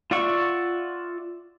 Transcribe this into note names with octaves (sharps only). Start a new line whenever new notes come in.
F4 D5 E5 F#5 C#6